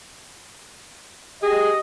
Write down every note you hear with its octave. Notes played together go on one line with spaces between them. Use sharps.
G4 G#4 D#5